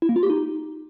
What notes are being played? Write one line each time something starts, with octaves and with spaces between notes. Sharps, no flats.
E4
A#3
F4
G4
D#4